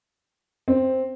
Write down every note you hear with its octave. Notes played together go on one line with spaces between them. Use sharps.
C4